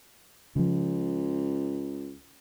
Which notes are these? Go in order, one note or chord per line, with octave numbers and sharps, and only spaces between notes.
C#2 C#3 F3